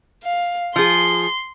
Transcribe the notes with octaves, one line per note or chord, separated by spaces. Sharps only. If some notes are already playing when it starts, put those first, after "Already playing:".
F5
F3 G#4 C6